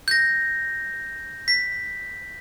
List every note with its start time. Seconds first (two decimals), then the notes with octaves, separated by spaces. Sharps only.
0.08 G6 A#6
1.48 B6